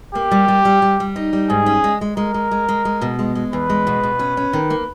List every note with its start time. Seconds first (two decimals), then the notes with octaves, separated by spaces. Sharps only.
0.15 A#3 G4
0.31 G3
0.48 G3
0.65 G3
0.82 G3
1.00 G3
1.16 D#4
1.33 G3
1.50 G#2 G#4
1.66 C#4
1.84 G#3
2.01 G#3
2.17 G#3 A#4
2.34 G#3
2.51 G#3
2.69 G#3
2.85 G#3
3.01 B2
3.19 G#3
3.35 G#3
3.52 E2 B4
3.70 G#3
3.87 B2
4.03 B2
4.19 C#4
4.37 C#4
4.53 D#3
4.70 A#3